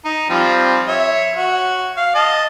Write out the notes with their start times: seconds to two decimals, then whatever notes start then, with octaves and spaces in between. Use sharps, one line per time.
0.05 D#4
0.30 F3 G3 C4
0.87 C#5 E5
1.36 F#4
1.97 F5
2.15 D#5 A5